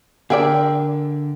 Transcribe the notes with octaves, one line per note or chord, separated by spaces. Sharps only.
D3 G#4 A#4 D5 E5 G5